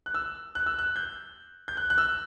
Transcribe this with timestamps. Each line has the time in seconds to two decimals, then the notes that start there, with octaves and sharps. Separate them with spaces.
0.06 F#6
0.14 E6
0.55 F#6
0.66 E6
0.79 F#6
0.96 G6
1.68 G6
1.77 F#6
1.90 F#6
1.98 E6